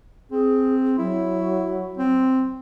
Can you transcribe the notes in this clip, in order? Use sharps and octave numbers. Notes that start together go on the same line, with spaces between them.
C4 G#4
F#3 E4
C4